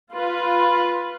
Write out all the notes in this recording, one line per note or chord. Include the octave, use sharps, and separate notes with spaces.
F4 B4